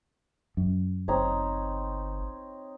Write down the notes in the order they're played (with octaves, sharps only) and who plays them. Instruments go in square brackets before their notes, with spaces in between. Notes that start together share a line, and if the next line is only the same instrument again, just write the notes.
[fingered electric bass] F#2
[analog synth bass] G1 [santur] C4 D#4 C#5